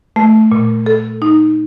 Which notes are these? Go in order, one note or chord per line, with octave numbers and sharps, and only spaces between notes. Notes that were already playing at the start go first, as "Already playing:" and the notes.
A3
A#2
A4
D#4